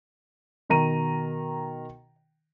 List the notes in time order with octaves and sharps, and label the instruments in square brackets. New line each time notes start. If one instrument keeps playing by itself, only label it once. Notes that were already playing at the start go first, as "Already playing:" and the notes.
[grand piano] B2 D#3 A#5 D#7